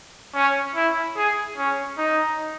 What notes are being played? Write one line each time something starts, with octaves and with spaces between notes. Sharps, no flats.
C#4
E4
G#4
C#4
D#4